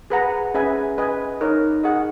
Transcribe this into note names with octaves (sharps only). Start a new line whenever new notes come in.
G#4 B4 F#5 A#5
C#4 G#4 B4 E5 G#5
B4 D#5 G#5
D#4 A#4 C#5
G#4 D#5 F#5 C#6